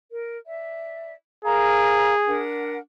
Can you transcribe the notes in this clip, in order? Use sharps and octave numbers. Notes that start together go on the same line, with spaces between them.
A#4
D5 E5
G#4 A#4 F5 A#5
D4 A#4 F#5